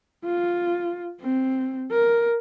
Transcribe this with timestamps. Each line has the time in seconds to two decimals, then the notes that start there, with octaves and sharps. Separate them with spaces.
0.25 F4
1.21 C4
1.91 A#4